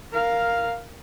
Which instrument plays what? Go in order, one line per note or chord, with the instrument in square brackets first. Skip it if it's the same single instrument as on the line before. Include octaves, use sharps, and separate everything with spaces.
[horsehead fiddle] A#4 F5